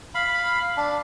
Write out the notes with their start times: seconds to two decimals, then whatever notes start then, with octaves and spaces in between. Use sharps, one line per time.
0.15 F5 B5
0.77 D4